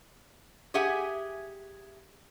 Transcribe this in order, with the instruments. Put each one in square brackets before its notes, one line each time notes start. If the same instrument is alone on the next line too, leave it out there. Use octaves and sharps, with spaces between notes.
[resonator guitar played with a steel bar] G4 G#4 E5 F#5 G#5